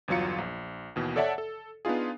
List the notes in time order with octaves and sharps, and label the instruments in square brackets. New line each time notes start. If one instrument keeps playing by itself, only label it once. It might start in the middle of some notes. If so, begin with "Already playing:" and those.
[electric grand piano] G1 E2 F#3 F4 C#7
A#1
D#2 B2 E3
A4 C#5 D5 E5 F#5 A5
A4
B3 D4 D#4 F4 G#4